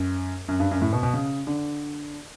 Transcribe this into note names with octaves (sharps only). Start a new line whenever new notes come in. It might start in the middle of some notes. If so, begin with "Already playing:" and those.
Already playing: F#2
F#2
G2
F#2
A2
B2
B2
C#3
D3